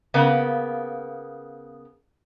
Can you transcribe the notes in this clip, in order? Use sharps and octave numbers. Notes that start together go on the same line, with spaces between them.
C#3 A#3 B3